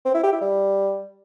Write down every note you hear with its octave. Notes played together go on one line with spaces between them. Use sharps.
C4
E4
G4
E4
G3